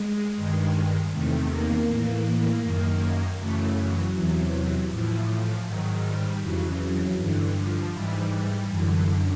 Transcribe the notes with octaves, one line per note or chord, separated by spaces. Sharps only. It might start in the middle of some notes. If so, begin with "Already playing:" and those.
Already playing: G#3
G2 D#3
E2 C3 D#3 A3
A#3
A2 E3
F#2 D#3
F#2 C#3 E3 A3
F#3
E2 C3 E3
A2 E3 F3
G#2 D#3 F#3
G3
F2 C#3 E3 F#3
F#3
G2 D3 E3
F3
G#2 E3 G3
G3
F#2 D3 E3